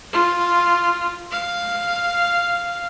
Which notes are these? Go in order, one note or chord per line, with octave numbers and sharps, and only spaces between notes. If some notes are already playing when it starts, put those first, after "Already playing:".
F4
F5